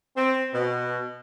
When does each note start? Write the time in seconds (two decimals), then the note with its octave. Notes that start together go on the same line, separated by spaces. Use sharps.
0.16 C4
0.54 B2